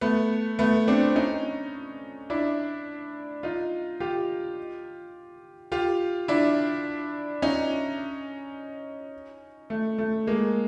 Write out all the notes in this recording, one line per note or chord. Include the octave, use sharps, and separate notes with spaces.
A3 B3
A3 B3
C4 D4
C#4 D#4
D4 E4
D#4 F4
F4 G4
F4 G4
D4 E4
C#4 D#4
A3
A3
G#3 A#3